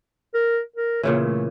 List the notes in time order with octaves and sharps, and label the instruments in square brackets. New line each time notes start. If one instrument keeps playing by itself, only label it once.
[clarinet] A#4
A#4
[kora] A#2 C#3 E3 [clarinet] C#5
[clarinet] A3